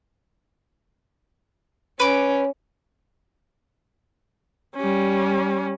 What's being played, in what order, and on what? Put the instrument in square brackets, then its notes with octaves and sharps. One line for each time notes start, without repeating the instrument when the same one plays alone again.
[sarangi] C#4 [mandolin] B4 D6
[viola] G3 C#4